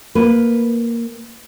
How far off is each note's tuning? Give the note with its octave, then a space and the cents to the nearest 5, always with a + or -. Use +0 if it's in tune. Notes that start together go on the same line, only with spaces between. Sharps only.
A#3 +0 B4 +0